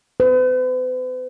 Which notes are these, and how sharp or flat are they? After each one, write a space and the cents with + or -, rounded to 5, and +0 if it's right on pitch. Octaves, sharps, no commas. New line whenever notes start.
B4 +45